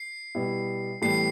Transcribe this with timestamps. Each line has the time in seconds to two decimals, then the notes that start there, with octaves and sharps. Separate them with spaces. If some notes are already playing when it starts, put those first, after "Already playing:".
Already playing: C7
0.35 B2 G3 B3 E4
1.02 A2 E3 G3 B3 C7